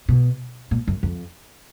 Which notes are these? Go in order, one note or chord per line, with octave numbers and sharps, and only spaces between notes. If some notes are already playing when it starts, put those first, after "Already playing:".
B2
A#2
F#2
F2